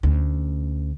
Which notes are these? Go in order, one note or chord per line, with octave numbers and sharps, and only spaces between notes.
D2 C#4